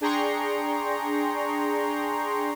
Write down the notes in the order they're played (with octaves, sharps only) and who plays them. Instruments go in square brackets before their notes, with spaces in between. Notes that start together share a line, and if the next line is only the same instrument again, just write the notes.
[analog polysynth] D4 G#4 G5 A#5 C6 C#6